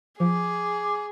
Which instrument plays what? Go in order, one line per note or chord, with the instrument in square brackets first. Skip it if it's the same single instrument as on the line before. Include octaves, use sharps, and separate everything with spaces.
[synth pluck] F3 [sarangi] G#4 [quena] D6